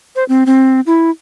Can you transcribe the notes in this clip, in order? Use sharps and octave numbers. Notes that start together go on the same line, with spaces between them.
C5
C4
C4
E4